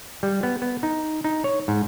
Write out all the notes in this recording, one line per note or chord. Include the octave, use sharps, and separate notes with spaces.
G3
B3
B3
D#4
D#4
C#5
G#2